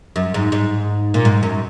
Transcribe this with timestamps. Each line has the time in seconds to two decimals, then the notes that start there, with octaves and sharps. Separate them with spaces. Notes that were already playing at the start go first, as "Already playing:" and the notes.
0.16 F#2
0.34 G#2
0.52 G#2
1.14 A#2
1.25 G#2
1.43 F#2